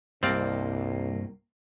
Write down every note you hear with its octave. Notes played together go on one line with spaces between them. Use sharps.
C2 G2 A#3 C4 D5 D#5 F5